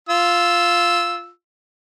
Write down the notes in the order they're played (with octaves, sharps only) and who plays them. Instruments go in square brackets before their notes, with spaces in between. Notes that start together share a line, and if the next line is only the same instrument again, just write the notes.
[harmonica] F4 E6